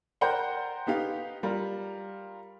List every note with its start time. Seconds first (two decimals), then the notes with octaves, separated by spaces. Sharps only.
0.21 A#4 C5 D5 F#5 G5
0.87 B3 D#4 G4 F5
1.43 G3 F4 A#4